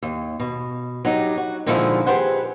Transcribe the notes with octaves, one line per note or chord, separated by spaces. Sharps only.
D#2
B2
F#3 D#4 G4
F#4
A#2 D3 D#3 F3 G#3 E4
G4 G#4 B4 C5 F#5